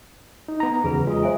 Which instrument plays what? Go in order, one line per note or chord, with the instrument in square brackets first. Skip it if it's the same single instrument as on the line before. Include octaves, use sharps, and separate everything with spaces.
[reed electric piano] D#4
B3 A#5
[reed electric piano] E2 C#3 F#3 [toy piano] G#4 B4
[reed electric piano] G#3 D#5 [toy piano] F4
[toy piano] C5 E5 G#5